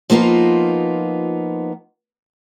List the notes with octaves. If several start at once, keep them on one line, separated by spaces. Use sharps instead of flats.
F3 A#3 B3 D#4 F4